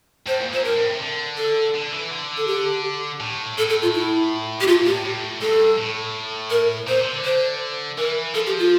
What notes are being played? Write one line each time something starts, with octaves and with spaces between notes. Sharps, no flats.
A2 C5
A#2
A#2 C5
G2 A#4
A2
C3
D3
A4
D3
E3
D3
A4
G4
A2
A2 A4
A4
F4
E4
G4
A2 F4
A#2
G4
A2
A2
G2 A4
A2
A#4
A#2 C5
C3
D3
C5
E3 A#4
F3 A4
G4
F4